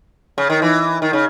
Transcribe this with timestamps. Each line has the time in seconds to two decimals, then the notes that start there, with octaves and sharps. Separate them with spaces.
0.38 C#3
0.50 D#3
0.62 E3
1.02 D#3
1.13 C#3